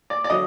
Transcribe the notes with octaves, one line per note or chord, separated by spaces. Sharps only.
D5
D5
D3 F#3 D#5